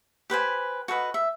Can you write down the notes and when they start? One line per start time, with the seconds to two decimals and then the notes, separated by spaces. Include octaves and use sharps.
0.30 G4 B4 C5 G#5
0.88 F#4 A4 B4 D#5
1.14 E5